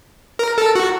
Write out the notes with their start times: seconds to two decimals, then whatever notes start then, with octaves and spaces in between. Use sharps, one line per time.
0.39 A#4
0.58 A4
0.75 F#4